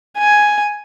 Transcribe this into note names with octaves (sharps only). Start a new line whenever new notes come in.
G#5